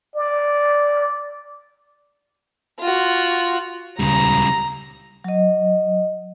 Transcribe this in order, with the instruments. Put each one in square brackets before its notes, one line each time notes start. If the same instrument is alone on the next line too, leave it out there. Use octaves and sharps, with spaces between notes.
[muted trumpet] D5
[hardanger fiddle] F4 F#4
[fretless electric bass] D#1 C#2 [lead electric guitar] C#3 G3 [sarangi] A#5
[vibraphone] F#3 D#5